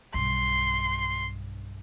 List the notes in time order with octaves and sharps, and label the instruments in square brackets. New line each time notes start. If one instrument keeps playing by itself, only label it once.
[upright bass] B1 G2 [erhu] C6